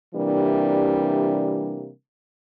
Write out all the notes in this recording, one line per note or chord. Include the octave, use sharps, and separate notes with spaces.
C3 E3 G3 A#3 D4